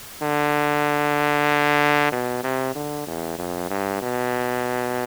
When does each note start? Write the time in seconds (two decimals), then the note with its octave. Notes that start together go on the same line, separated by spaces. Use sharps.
0.22 D3
2.12 B2
2.43 C3
2.75 D3
3.07 E2
3.39 F2
3.70 G2
4.02 B2